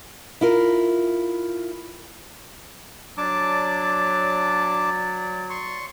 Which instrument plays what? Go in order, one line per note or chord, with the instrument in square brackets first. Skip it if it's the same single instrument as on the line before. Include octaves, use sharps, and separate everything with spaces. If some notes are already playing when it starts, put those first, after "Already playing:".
[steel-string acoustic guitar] E4 F4 A#4
[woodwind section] F#3 D5 [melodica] D4 A5 D6
[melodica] C6 C#6